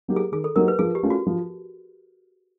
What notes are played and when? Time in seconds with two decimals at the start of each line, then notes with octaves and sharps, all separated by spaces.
0.08 F#3 A#3 D#4 G4
0.16 G#4
0.32 D#3 G#4
0.44 A4
0.56 F#3 A#3 D#4 G4 A#4
0.68 B4
0.79 F3 G#4
0.95 G4
1.03 A3 C#4 F4 G#4
1.10 F#4
1.27 F3